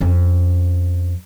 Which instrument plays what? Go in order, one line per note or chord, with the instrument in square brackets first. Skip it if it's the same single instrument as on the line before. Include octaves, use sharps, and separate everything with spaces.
[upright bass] F2 C#4